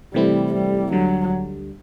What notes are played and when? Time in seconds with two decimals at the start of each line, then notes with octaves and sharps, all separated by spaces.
0.14 C3 E3 G3 A3 C4 E4
0.53 G3
0.92 D2 D3 F#3 G3